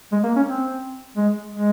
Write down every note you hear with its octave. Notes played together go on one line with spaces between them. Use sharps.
G#3
A#3
C#4
C4
G#3
G#3